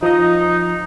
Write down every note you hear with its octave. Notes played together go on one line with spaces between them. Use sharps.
F3 D#4 D#5